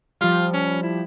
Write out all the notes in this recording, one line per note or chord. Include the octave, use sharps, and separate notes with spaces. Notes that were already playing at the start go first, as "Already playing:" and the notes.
F3 G3 F4
C#4
E4